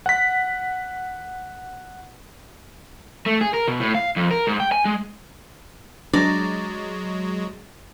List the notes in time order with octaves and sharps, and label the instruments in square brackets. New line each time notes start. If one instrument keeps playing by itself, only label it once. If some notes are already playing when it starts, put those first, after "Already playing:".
[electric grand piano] F#5 B6
[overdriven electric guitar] A3
G#4
A#4
B2
A2
F5
F2
A#4
G#2
G5
G#5
G#3
[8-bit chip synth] F#3 G#3 [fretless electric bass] D4 [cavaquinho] D5 A#5